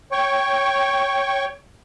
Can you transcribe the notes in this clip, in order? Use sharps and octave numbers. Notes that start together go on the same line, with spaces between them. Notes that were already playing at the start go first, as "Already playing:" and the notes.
C#5 G5 C#6